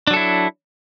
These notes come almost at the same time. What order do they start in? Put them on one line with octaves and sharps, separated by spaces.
D4 F#3 A4 E4